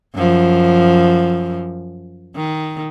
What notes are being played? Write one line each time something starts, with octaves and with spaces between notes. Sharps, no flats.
F#2 F3
D#3